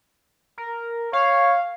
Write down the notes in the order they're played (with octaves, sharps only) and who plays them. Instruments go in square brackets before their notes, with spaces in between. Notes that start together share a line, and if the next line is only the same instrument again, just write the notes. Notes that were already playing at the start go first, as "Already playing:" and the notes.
[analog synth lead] A#4
[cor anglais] C#5 [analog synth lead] F5